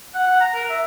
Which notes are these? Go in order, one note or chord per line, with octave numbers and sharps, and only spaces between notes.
F#5
F#5
A#5
A#4
E5